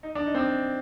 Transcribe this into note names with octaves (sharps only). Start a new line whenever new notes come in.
D#4
D4
D#4
C4
D4